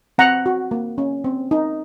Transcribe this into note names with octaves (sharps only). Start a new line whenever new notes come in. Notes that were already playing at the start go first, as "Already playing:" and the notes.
C4 F#5 A#5
F#4
A#3
C#4
C4
D#4